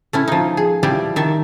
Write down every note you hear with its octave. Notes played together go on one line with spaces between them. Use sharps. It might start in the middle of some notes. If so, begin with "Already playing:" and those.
A3 C#4 E4
F3 D#4
G#4
F3 G3 E4 G4 D5
D#3 E5 A5